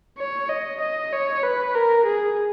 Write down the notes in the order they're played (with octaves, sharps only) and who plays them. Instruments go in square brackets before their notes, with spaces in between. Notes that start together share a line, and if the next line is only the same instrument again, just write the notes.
[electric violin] C#5
D#5
D#5
C#5
B4
A#4
G#4